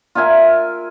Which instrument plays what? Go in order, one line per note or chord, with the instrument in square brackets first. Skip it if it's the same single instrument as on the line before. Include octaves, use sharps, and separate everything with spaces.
[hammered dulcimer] F4 A#4 E5 G#5